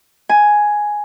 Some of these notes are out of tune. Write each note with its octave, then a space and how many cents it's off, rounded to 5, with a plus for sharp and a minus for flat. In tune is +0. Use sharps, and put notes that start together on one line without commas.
G#5 +5